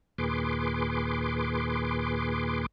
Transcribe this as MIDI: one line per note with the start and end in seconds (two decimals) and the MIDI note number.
0.18 2.66 39
0.18 2.66 46
0.18 2.66 68
0.18 2.66 71
0.18 2.66 84
0.18 2.66 86